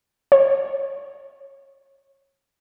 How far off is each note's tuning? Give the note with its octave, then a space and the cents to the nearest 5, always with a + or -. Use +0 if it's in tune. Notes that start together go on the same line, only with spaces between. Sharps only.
C#5 -20